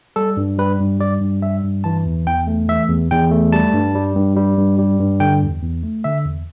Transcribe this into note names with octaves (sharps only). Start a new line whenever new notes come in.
G3 A4
G2
G3 B4
G2
G3 D5
G2
G3 E5
G2
E3 A5
E2
E2 G5
A3
E3 E5
E2
E2 G5
A3
G3 A5
G2
G3
G2
G3
G2
G3
G2
D3 G5
E2
E2
A3
D3 E5
E2